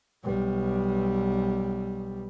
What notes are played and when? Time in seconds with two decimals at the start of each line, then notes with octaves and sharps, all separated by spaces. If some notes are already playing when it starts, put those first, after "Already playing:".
0.24 B1 G3